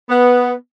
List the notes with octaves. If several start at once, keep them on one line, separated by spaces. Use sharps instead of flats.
B3